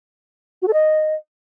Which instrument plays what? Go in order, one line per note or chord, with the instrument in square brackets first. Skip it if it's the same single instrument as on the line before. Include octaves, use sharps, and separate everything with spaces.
[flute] F#4
A4
D#5